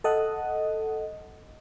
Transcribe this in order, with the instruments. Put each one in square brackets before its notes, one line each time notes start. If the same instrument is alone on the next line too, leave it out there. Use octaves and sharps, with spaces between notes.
[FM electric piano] A4 D#5 F#5